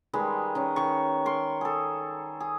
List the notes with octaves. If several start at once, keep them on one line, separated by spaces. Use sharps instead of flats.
D#3 G3 G#3 B4
D#3 C#4
D#3 C#6
A#4 C6 C#6
G#4 A4
G#4